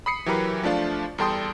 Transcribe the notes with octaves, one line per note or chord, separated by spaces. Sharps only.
B5 D#6 C7 C#7
E3 F#3 G4 A#4 B4
F3 A3 D4 F4
E2 G3 A4 G5 C6 D#6